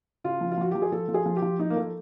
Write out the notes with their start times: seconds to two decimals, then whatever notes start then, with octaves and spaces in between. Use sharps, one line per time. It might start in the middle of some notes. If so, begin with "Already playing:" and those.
0.24 C#3 F4
0.41 F3
0.51 F4
0.57 F3 F#4
0.71 F3 G4
0.82 G#4
0.92 F3 A4
1.08 F3
1.14 G#4
1.26 F3
1.37 G4
1.42 F3
1.59 F3 D#4
1.70 A#3
1.76 F3 A3